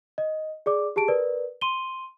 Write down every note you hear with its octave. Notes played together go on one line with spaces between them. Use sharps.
D#5
G#4 D5 D6
G4 G#4 A5 D7
A#4 B4 D5
C6 D#7 G7